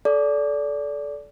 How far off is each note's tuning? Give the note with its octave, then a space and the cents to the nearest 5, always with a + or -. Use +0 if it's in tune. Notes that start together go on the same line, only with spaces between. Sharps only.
A4 -25 D5 -20